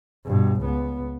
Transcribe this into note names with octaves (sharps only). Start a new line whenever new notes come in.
G2 B2
C#2 B3